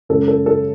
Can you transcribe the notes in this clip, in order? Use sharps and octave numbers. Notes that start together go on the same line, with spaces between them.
F#2 C#3 G#3 A4
A4
A4